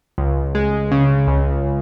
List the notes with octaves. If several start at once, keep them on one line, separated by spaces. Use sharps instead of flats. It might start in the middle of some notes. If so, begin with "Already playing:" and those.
C#2
G#3
C#3
C#2